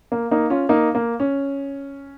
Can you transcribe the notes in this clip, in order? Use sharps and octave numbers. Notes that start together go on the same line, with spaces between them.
A#3
A#3 D#4
C#4 F4
A#3 D#4
A#3
C#4